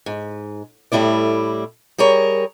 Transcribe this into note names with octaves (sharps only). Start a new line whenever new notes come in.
G#2
A2 G3 A3 E4 D5
G3 G#4 A#4 C#5